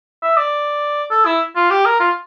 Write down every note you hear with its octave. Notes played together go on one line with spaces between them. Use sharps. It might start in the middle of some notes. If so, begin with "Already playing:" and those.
E5
D5
A4
E4
F4
G4
A#4
F4